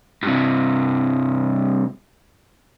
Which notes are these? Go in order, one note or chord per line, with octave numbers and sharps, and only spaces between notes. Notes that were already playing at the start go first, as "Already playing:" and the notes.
G2 C3